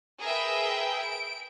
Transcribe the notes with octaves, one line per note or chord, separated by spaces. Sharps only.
G#4 A#4 B4 E5 G5
D7